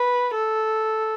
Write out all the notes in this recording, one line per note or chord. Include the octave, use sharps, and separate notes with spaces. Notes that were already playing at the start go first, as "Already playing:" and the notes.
Already playing: B4
A4